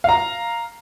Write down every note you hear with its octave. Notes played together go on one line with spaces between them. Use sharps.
F5 A#5